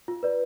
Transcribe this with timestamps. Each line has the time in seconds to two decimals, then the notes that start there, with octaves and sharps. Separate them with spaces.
0.08 F4
0.23 B4 D5